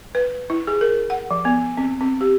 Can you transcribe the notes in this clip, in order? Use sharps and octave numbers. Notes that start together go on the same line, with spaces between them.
B4
E4
G#4
A#4
F#5
F3
B3
C4
C4
G4